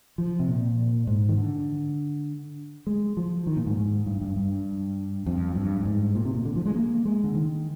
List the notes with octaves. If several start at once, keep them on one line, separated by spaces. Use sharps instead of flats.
F3
C3
A#2
G#2
D#3
D3
G#3
F3
D#3
A#2
G#2
G#2
G2
G2
G2
F2
G2
G2
G#2
A#2
C3
A#2
D3
F3
G#3
A#3
G#3
D3
D#3